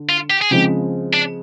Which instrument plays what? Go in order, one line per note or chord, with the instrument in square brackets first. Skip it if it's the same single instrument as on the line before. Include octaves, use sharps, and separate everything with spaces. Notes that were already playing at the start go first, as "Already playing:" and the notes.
Already playing: [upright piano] D3
[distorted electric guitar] F4
G4
G#4
[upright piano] C#3 F3 G#3 C4 [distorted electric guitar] G4
[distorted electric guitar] D4